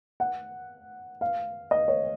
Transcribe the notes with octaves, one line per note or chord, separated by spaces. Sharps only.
F#5
F5
D#5
C#5